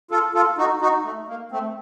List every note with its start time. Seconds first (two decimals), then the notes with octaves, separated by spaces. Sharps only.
0.11 F4 A4
0.34 F4 A4
0.58 D#4 F#4
0.81 D#4 F#4
1.05 A3
1.28 A#3
1.51 A3 C4